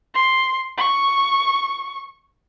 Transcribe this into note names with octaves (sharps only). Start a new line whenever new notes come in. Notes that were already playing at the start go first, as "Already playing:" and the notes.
C6
C#6